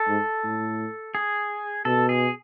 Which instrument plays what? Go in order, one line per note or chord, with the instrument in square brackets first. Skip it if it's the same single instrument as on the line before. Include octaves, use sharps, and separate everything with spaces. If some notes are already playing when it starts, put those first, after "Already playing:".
Already playing: [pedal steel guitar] A4
[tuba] G#2
A2
[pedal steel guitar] G#4
[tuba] B2 [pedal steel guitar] A4
[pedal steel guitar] G#4